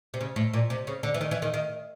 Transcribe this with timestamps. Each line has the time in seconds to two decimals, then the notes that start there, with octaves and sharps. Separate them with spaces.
0.14 C3
0.21 C#3
0.36 A2
0.53 A#2
0.70 C3
0.87 C#3
1.03 D3
1.14 E3
1.21 D#3
1.31 E3
1.42 D#3
1.54 D#3